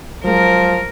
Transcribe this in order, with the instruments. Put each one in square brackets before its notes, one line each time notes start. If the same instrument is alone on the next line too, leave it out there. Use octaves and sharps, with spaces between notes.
[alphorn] F3 [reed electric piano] F#3 G#3 [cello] A#4